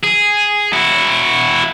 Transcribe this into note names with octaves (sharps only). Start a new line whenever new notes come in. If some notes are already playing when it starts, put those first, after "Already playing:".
G#4
E4 F#4